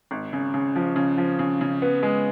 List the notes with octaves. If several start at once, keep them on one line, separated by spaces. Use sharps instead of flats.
G#1
C#3
C#3
F3
C#3
F3
C#3
C#3
B3
G#3